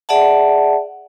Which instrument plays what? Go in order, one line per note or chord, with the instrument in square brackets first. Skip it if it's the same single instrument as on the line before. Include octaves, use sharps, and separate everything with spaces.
[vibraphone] G#4 D5 E5 F#5 A5